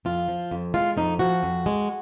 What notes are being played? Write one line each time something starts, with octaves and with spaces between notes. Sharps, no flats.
F2 F4
F3
F2
G#3 F4
F2 D#4
F3 F#4
F2
G#3